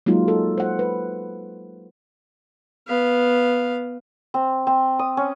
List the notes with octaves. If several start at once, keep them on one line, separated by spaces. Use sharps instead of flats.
F#3 G#3 A#3 D#4 F4
A4
C5 F#5
B4
B3 F5
C4
C4
D#6
C#4